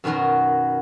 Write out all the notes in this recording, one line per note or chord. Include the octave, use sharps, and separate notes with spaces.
F#2 B2 D#3 F#3 A#4